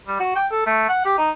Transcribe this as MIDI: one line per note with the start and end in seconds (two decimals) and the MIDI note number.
0.08 0.17 55
0.20 0.36 66
0.36 0.46 79
0.52 0.63 69
0.66 0.85 57
0.89 1.03 78
1.05 1.17 67
1.18 1.31 63